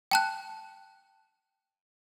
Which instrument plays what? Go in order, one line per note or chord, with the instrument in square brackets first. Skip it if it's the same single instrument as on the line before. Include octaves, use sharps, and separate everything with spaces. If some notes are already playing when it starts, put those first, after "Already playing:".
[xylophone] G5 A5 F#6